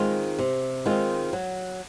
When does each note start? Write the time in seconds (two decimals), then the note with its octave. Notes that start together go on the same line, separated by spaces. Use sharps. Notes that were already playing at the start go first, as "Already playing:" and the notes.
Already playing: D#3 G#3 C4 F4
0.39 C3
0.86 D#3 G#3 C4 F4
1.33 F#3